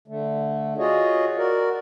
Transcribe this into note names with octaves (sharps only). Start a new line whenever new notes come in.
D3 A3
F4 F#4 G#4 C#5 D#5
F#4 A#4 D5